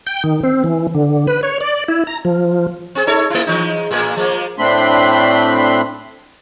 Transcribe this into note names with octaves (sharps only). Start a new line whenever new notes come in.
G5
D#3
C4
E3
D3
B4
C#5
D5
E4
A#5
F3
C4 G#4
D#4 A4 C#5
A3 E4
E3 G#3 D#4
A2 A#3 G#4
F3 G#3 A#3
A2 A3 C4 D4 B5 C6